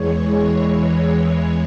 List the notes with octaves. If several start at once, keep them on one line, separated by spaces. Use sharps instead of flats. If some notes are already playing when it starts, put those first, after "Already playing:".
Already playing: E2 E3 G#3 C#5
C#5
C#5